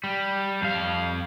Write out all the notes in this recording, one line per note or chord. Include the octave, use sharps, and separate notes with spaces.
G3
F2 F5